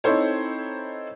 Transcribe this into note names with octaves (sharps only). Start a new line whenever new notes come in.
C4 D#4 E4 A4 C5 C#5